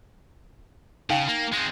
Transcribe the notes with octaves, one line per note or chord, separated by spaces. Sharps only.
C#3 D#4 F5 G5
A#3
G#3 C4